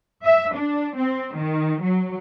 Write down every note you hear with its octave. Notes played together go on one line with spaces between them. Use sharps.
E5
D4
C4
D#3
F#3